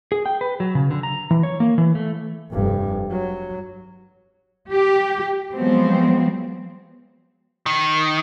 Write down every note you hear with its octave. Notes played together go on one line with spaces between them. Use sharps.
G#4
G5
B4
F#3
C#3
D3
A#5
E3
C#5
A#3
E3
A3
F1 G2
F#3
G4
F3 F#3 G#3 B3 C4
D#3